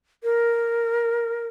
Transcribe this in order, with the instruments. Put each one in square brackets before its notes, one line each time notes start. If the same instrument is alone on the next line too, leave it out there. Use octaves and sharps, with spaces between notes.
[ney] A#4